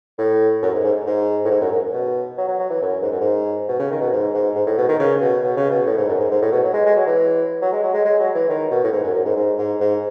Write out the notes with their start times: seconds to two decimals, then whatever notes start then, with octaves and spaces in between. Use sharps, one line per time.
0.18 A2
0.62 F#2
0.73 G#2
0.84 G#2
1.06 G#2
1.45 A2
1.50 G#2
1.61 F#2
1.72 F#2
1.94 B2
2.38 F#3
2.48 F#3
2.59 F#3
2.70 E3
2.81 F#2
3.02 G#2
3.11 F#2
3.20 G#2
3.68 B2
3.79 C#3
3.91 D#3
4.01 B2
4.12 G#2
4.34 G#2
4.56 G#2
4.66 A2
4.78 B2
4.88 D#3
5.00 C#3
5.21 B2
5.43 B2
5.57 C#3
5.70 B2
5.86 A2
5.97 G#2
6.08 F#2
6.20 G#2
6.31 G#2
6.42 A2
6.52 B2
6.64 F#3
6.74 G#3
6.86 G#3
6.96 F#3
7.07 E3
7.62 F#3
7.73 G#3
7.83 F#3
7.94 G#3
8.05 G#3
8.19 F#3
8.35 E3
8.49 D#3
8.71 B2
8.84 A2
8.92 G#2
9.04 F#2
9.14 F#2
9.25 G#2
9.36 G#2
9.58 G#2
9.80 G#2